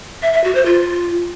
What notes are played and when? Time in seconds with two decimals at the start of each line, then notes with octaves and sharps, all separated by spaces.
0.22 E5
0.33 E5
0.44 F#4
0.55 C5
0.66 F4